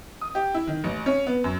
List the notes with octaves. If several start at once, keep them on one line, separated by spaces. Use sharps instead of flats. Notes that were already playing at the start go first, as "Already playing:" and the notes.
D#6
G4
E4
D#3
A1
C#4
B3
F#2